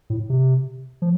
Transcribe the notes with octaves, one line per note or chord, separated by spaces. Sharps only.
A2
C3
F3